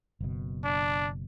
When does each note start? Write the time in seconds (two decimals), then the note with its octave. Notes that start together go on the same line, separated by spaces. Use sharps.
0.20 F#1 B2
0.65 D4